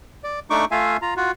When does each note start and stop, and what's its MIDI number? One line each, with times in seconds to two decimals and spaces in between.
0.24 0.40 74
0.50 0.65 57
0.50 0.65 62
0.50 0.65 63
0.50 0.65 85
0.50 0.65 86
0.71 0.97 57
0.71 0.97 65
0.71 0.97 76
0.71 0.97 77
0.71 0.97 80
1.02 1.14 65
1.02 1.14 82
1.17 1.31 65
1.17 1.31 66